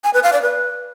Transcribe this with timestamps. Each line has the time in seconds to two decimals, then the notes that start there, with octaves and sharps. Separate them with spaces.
0.04 G#5
0.14 B4
0.23 F5
0.33 D5
0.42 B4